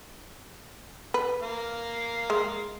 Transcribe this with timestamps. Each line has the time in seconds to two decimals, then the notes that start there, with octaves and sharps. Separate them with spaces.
1.14 B4
1.43 A#3 F5
2.30 G#3